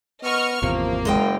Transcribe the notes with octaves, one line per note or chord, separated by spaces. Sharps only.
B3 D#5 C#6 F6
G#1 E2 C3 F3 A#3
F#1 G#3 D#5 G5